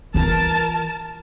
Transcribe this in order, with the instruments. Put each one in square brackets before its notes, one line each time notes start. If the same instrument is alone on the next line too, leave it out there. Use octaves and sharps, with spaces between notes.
[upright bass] E3 F4 [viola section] A#4 A5